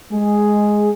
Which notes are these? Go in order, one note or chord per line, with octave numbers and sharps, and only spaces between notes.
G#3 G#4